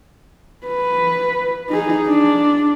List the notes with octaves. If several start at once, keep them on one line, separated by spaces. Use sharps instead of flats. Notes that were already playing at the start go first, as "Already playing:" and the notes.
B4
D#4 G#4
D4